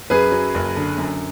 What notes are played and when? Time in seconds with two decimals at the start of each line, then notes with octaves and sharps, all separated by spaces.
0.10 F#2 G#4 B4
0.32 F#3
0.54 F#1
0.76 D3
0.98 F#2